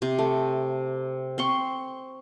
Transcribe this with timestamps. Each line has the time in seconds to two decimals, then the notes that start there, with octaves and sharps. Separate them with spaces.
0.02 C3
0.19 A3
1.38 C4 C6 C#6